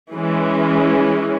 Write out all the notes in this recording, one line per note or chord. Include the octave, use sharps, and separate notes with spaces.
E3 G#3 C#4